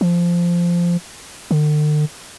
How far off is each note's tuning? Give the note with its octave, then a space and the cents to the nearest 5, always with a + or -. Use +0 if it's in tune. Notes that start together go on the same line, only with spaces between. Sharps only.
F3 -10
D3 +45